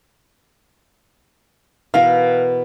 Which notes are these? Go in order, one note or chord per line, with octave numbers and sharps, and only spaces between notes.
B2 E3 A#4 F5